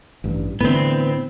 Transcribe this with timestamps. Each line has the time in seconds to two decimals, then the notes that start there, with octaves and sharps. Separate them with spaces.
0.24 A1 G2
0.61 A2 D3 E3 B3 C4